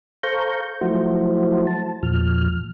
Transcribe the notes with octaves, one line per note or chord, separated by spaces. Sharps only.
A4 C5 F5 A#5 C#6 G6
F3 F#3 A3 E4 F#4 C5
A5
E2 A#2 F3 F6